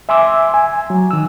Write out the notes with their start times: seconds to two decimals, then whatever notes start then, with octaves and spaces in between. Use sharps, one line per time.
0.09 E5 G#5 C6 D6 E6
0.54 G#5
0.90 F#3
1.11 D#3 E6